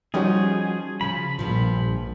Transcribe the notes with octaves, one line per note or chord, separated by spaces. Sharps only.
F3 G3 C#4 D#4 F#4 G#4
C#3 F3 B5
A#1 G2 F3